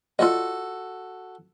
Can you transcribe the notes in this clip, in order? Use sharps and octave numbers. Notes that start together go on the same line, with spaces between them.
F4 F#4 A4 D5 D#5